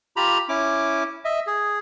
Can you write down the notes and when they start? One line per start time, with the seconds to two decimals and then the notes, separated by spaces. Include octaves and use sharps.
0.17 F4 G4 A#5 B5
0.49 C#4 E4 D6
1.25 D#5 E5
1.47 G#4